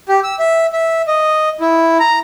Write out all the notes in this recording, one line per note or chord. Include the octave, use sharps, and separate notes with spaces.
G4
E6
E5
E5
D#5
E4
A#5